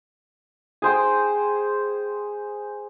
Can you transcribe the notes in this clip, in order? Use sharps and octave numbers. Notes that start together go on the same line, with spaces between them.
G#4 C5 G5